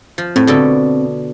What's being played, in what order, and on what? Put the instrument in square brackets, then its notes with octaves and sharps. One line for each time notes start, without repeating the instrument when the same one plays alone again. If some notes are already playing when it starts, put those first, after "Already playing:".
[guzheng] F3
[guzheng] A2 [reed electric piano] C4
[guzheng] B2 D3 A4